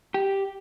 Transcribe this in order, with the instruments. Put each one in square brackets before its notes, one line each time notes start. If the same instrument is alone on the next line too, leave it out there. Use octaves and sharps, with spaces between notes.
[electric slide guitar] G4